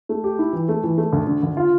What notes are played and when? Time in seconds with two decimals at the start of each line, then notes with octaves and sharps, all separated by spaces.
0.09 A3
0.24 G4
0.39 E4
0.53 E3
0.69 A3
0.84 E3
0.98 A3
1.13 D2
1.27 D3
1.43 D2
1.57 F4